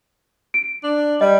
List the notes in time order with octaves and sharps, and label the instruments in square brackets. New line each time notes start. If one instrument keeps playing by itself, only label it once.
[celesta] D7
[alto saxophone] D4
[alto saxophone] G3 [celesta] D#5